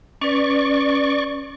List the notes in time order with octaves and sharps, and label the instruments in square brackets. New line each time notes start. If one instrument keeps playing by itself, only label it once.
[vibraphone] C#4 B4 [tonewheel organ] D5 C#6